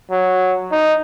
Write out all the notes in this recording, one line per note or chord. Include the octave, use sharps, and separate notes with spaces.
F#3
D#4